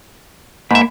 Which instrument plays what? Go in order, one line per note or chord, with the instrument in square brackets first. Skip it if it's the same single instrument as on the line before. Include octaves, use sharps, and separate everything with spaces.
[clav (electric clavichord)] G#2 E5 [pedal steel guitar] A#3 B5